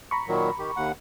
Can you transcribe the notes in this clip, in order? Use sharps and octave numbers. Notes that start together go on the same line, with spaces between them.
A#5 B5 C#6
A#2 D#3 F#3
D#3 G4
D#2 F#5